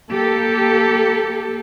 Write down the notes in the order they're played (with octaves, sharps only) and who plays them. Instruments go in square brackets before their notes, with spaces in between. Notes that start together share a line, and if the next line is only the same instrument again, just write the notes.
[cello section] A#3 G4 A4